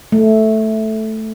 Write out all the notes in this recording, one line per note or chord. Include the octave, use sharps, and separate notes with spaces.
A3